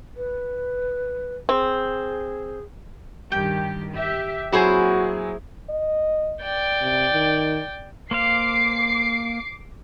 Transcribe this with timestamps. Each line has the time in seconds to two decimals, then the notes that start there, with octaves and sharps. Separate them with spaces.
0.17 B4
1.49 C4 G#4
3.32 G2 D#3 G4 G5
3.94 G4 E5
4.52 A#2 F#3 C4 E4 F#4 G#4 C5 G#5
5.70 D#5
6.43 D5 G5
6.81 C3
7.12 D#3
8.11 A#3 C5 F5 D6 C7